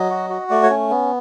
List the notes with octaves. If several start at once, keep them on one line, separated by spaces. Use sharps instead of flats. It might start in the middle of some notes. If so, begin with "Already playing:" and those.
Already playing: F#3 D#5
F#4
F#4
A3 D5
C#5
C#4
B3